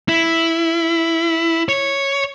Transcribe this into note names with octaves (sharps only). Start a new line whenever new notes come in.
E4
C#5